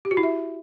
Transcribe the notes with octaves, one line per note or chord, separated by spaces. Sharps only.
G4
F#4
E4
E5